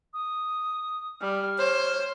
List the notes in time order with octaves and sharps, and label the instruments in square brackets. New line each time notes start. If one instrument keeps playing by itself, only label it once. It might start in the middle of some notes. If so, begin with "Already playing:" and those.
[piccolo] D#6
[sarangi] G3 [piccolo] F6
[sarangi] C5 [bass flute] C#5